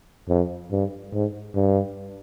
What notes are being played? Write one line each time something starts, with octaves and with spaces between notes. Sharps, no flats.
F2
G2
G#2
G2